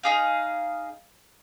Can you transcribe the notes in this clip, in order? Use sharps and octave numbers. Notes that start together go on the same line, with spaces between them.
D#4 G#4 F5